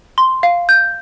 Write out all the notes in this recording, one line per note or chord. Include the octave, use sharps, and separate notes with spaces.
C6
F5
G6